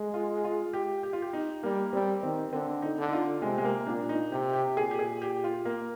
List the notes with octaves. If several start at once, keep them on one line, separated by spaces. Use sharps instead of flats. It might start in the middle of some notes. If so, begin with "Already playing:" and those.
Already playing: G#3
F4
F4
G4
G4
F4
G4
D#4
G3 A#3
G3 C4
D#3 C4
D3 C4
D#4
D3
D#4
F4
C3 G#3
G#3
A#3
A#2 D4
D#4
C3 G4
G4
A#2 G#4
G4
G#4
G4
F4
A#3